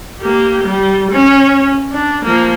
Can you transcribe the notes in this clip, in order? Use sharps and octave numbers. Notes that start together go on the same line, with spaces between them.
A#3 G4
G3
C#4
D4
F3 A#3